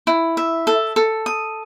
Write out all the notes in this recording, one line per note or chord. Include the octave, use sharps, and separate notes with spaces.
E4
E5
A4
A4
D#6